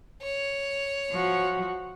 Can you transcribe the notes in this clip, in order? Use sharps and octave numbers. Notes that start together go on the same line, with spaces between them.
C#5
F3 F#4